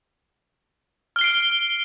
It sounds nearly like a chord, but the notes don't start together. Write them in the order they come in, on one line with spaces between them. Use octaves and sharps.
F6 G7 C7 D7